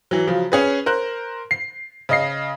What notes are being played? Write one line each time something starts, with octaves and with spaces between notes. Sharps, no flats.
E3 F#3
C#3 F3 F#3
C#4 G#4 B4
A#4 C5 F#6
C7
C#3 D#5 C7